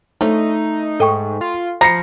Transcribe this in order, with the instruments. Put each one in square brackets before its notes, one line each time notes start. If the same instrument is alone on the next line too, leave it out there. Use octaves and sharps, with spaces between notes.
[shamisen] F3 D4 C#5 [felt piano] A3 [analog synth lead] D#4
[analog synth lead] G#2 [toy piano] A4 G5 C#6 [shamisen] D#5
[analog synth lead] F4
[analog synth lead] F3 [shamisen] A#5 [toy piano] B5 [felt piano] A#6 C7 C#7